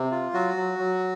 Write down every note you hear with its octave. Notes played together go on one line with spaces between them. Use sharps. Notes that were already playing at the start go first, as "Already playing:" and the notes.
Already playing: C3
F4
F#3 F#4
F#3
F#3